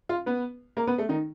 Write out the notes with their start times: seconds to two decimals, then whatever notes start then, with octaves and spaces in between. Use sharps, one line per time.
0.09 F4 F5
0.26 B3 B4
0.77 A#3 A#4
0.87 B3 B4
0.98 A3 A4
1.09 D#3 D#4